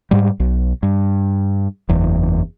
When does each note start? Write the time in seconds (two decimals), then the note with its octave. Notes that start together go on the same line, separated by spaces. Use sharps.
0.11 G#2 G3
0.40 B1
0.83 G2
1.89 F#1 E2